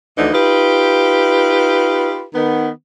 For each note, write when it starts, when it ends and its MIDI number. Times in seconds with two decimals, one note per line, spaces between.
0.18 0.32 38
0.18 0.32 50
0.18 0.32 52
0.18 0.32 53
0.18 0.32 63
0.33 2.24 63
0.33 2.24 65
0.33 2.24 67
0.33 2.24 71
2.34 2.69 51
2.34 2.69 59